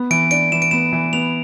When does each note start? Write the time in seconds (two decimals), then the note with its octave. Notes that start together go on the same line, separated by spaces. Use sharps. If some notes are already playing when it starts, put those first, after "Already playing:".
Already playing: B3
0.11 E3 D7
0.31 D4 D7
0.52 E3 E7
0.62 D7
0.71 B3 E7
0.93 E3
1.13 B3 F7